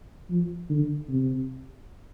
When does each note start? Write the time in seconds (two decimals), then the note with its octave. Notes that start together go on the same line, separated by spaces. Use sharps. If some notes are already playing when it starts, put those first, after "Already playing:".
0.30 F3
0.70 D3
1.09 C3